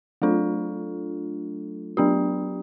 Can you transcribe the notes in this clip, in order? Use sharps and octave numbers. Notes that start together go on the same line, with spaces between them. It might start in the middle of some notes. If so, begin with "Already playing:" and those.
F#3 A3 D4 F4 A4
F#3 B3 D4 G4